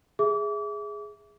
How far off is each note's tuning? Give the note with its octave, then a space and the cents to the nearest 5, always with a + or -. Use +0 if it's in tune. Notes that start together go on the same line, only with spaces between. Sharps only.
G#4 +0 E5 +0 D6 -35